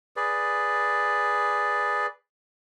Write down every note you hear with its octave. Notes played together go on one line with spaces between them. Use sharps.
G#4 B4 D5